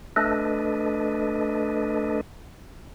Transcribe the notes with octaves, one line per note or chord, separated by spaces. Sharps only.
A3 D4 A4 B4 D#5